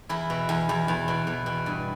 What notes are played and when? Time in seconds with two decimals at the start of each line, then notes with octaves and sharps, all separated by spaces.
0.09 E2 E4
0.30 B2
0.49 E2
0.69 E2
0.88 E2
1.08 B2
1.27 E2
1.46 B2
1.66 G2